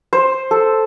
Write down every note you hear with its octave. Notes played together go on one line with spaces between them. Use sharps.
C5
A4